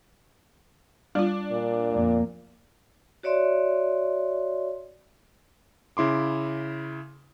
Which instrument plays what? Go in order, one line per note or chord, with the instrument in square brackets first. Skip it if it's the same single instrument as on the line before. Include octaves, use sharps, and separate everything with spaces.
[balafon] G3 F4 [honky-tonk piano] D4
[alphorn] A#2
[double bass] F2 A#3
[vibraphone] F#4 C#5 D5 E5 C6
[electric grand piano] C#3 E4 C6 D6